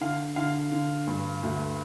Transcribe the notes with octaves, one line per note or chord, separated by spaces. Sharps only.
D3 F5
D3 F5
D3
G2
D2